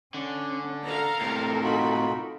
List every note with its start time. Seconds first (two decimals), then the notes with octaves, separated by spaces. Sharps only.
0.14 D3 C#4
0.85 A4 A#4 F5 A#5
1.21 A2 C3
1.63 D#4 F4 F#4 B5